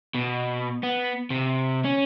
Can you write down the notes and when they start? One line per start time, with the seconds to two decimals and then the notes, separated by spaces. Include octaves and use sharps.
0.15 B2
0.83 B3
1.30 C3
1.85 C#4